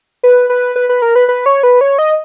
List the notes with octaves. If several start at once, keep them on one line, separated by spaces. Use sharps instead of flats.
B4
B4
B4
B4
A#4
B4
B4
C#5
B4
C#5
D#5